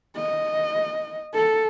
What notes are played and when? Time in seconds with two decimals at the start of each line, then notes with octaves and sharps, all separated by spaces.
0.16 D#5
1.35 A4